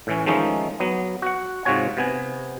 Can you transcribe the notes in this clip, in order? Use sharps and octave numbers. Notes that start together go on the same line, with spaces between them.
A2 E3 C#4
D#3 F3 G#3 A3 C#4 D#4
F#3 B3
F#4 F#5
G#2 C3 F4 F#4 C#5 G#5
C3 B3 G#5